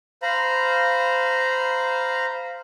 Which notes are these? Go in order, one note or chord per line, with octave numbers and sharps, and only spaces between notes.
C5 F5 A#5 B5